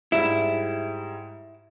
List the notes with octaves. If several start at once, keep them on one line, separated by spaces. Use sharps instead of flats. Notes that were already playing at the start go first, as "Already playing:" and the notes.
G#2 G3 E4